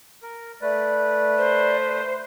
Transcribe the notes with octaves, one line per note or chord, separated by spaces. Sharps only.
A#4
A3 B4 D5
C5